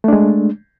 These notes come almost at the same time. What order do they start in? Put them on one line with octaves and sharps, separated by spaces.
A3 D4 G#3